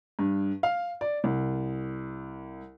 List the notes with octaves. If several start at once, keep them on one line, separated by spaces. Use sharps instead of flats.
G2
F5
D5
C2